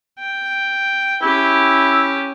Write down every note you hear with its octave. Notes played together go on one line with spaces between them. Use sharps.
G5
C#4 E4 G4